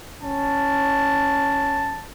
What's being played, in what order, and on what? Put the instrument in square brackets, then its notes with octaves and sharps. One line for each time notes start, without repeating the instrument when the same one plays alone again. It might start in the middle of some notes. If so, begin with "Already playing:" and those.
[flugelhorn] C#4 [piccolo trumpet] A5